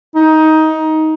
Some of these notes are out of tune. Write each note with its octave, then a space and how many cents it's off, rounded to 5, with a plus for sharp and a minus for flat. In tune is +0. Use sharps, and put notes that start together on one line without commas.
D#4 +15